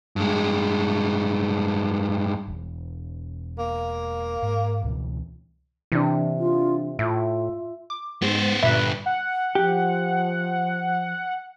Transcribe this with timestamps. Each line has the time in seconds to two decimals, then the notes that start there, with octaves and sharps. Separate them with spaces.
0.16 G2 G#3
2.48 E1
3.58 A#3
4.42 G#2
4.83 C#2 B2 E3
5.92 C3 E3 D4
6.39 F4
6.99 A2 F4 E5
7.90 D6
8.22 G#2 B3 C5
8.63 G2 A#2 D3 B4 E5
9.06 F#5
9.55 F3 G4